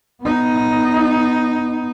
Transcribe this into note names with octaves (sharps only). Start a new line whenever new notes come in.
B3 D#4